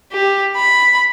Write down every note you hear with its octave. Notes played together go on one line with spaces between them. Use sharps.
G4
B5